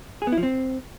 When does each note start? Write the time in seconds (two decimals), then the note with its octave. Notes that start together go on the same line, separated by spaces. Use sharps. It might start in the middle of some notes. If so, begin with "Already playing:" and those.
0.22 G#4
0.27 B3
0.32 E4
0.38 F3
0.43 C4